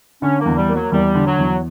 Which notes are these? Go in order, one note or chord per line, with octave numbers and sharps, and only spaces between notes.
D3 C#4
A#3
E2
G3
A#3
F#3
E2 G3
D3
F#3
E2